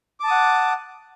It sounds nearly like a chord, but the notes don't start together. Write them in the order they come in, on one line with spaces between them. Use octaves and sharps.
D6 A5 D#6 F#5